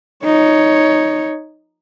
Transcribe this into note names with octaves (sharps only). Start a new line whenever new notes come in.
D#4 C#5